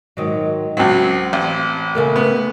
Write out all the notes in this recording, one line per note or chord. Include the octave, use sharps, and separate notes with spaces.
G#2 D#3 F#3
C#2 F#3 C4 F4 C5
A1
C#3 A3 A#3
B3